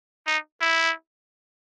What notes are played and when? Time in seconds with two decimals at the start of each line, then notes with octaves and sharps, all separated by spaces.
0.27 D#4
0.61 E4